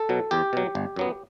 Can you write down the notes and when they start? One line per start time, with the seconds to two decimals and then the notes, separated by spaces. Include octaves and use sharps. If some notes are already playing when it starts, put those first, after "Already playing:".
Already playing: A4
0.09 B2 F#3
0.31 E2 G4
0.53 B2 F#3
0.75 G1
0.96 F#2 F#3 B3